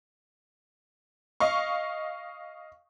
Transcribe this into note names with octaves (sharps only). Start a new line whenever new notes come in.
D#5 F5 C#6